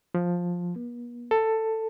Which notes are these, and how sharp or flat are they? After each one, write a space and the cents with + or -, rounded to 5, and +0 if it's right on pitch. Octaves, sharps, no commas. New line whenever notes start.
F3 +10
B3 -45
A4 +10